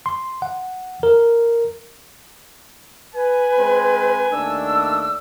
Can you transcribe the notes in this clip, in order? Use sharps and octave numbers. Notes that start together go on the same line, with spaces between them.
C6
F#5
A#4
B4 G#5
G#3 C4 C5
D#2 A3 D4 E6